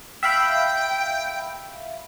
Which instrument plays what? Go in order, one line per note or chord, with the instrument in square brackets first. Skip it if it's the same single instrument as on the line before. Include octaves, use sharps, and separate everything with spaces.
[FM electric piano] E5 F5 B5 [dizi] G5